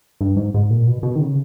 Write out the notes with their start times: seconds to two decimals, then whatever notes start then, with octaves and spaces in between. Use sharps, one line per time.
0.21 G2
0.37 G#2
0.54 G#2
0.71 A#2
0.87 B2
1.03 B2
1.16 D#3
1.20 C#3